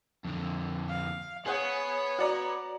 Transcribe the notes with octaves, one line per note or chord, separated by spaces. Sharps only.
F2 D3
F5
B3 G#4 C#5 F#5 D#6
F#4 D5 A#5